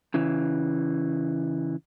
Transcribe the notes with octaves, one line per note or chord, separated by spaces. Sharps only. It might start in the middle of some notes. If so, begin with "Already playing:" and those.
C#3 E3